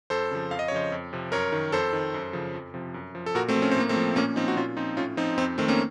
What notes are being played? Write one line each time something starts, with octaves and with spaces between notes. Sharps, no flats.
F2 A4 C5
C#3 F3
F2 F5
D#5
C#5
C#3 F3 C5 D#5
F2
C3 F3
F#2 A#4 C#5
D#3
F2 A4 C5
D#3
F#2
C#3 F3
F2
C3 F3
F#2
F3
A4
A#2 F#4 A#4
A3 C4
F3
C#4
C4
A2 A#3
A3 C4
F3
A#2 A#3 C#4
F3 C4 D#4
F#4
A#2 C#4 F4
F3 C4 D#4
A2 C#4 F4
F3 C4 D#4
F2 C4 D#4
D#3 A3 C4
A#3 C#4